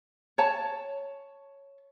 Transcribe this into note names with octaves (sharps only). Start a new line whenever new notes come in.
C#5 A5